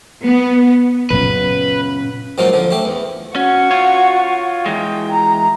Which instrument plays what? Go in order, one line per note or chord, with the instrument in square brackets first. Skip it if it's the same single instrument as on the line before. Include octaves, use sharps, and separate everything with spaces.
[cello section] B3
[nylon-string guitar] F#2 C#3 [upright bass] A#2 B3 [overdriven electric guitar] B4
[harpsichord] G#2 F#3 A#3 F4
D3 F3
A3 G4
E2
[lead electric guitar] C#4 [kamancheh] F#4 C#6
[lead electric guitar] F4 C#5
[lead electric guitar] E3 G#3 [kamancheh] G5
[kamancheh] A#5